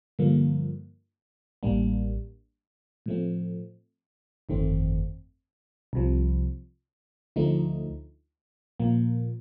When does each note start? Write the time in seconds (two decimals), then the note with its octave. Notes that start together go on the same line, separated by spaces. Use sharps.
0.19 G2 D3 F3 A#3
1.63 A1 A2 G3 A#3 D4
3.06 A2 F3 A3 C4
4.49 G1 F2 D#3 A3 C4
5.93 C2 C3 F3
7.36 D2 D3 F3 A3 D#4
8.80 A#2 F3 A#3